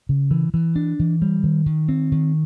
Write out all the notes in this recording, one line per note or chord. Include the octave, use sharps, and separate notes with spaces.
C#3
E3
E3
D4
E3
G3
D#3
D#3
C4
D#3